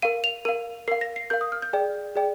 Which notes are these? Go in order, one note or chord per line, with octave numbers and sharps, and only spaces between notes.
A#4 F5 D#7
F7
A#4 F5 D#7
A#4 F5 C7
A#6
C7
A#4 F5 G6
D#6
F6
G6
G#4 D5 G5
G#4 D5 G5